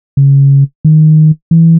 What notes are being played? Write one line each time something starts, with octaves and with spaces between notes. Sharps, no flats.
C#3
D#3
E3